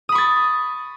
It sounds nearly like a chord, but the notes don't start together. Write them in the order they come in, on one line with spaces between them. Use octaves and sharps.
D#6 B5 C#6 A6